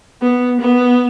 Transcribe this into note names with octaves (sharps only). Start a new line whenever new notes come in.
B3
B3